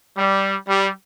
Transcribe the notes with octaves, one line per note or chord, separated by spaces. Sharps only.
G3
G3